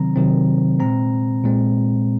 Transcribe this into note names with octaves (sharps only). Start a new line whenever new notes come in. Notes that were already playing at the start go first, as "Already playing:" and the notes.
Already playing: C3 D#3 F#3 C4 A#5
C3 D#3 F#3 C4
A#2 G#3 C4 A#5
A#2 G#3 C4